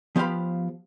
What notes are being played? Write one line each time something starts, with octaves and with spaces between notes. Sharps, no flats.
F3 B3 G4 C5 F5 B5